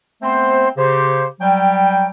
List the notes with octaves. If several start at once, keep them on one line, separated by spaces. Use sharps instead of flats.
A3 B3 C4 C5
C#3 G4 C5
F#3 G3 G5